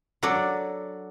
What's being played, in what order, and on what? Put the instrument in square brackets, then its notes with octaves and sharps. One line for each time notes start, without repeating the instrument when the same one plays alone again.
[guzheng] F#3 D4 A4 D5